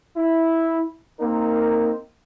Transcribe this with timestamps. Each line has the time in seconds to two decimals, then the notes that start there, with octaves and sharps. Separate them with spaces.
0.17 E4
1.20 A#3 C4 D#4 A#4